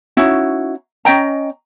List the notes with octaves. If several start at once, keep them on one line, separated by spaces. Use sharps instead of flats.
C#4 D#4 E4 F#4
C#4 D#5 G5 A#5